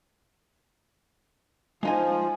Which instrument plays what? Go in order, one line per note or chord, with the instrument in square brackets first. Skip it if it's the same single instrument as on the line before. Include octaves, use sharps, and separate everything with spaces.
[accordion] F3 [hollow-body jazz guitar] G#3 D#4 G#5